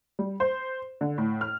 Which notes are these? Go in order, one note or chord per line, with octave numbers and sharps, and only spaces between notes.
G3
C5
D3
A2
F6